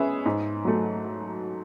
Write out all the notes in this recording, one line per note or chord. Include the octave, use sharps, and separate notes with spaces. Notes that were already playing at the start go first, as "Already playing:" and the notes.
Already playing: G#3 C#4 G#4 B4 E5
G#2
F#3 A3